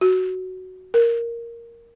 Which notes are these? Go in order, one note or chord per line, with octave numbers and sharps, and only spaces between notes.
F#4
A#4